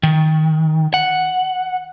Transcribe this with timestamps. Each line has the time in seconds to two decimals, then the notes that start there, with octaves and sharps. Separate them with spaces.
0.03 D#3
0.94 F#5